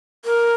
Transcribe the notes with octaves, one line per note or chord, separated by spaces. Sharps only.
A#4